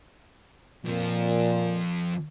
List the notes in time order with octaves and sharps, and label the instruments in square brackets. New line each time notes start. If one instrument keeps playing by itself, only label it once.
[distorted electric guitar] F2 F3 [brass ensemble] A#2